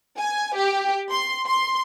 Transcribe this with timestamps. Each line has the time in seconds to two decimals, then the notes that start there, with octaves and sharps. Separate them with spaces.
0.18 G#5
0.56 G4
1.11 C6
1.46 C6